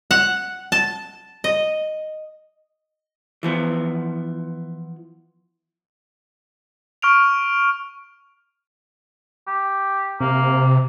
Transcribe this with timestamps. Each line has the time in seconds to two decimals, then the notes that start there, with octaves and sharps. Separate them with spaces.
0.11 F#5
0.72 A5
1.44 D#5
3.43 E3 F3 B3
7.02 C#6 F6 D7 F7
9.47 G4
10.20 C3 A#3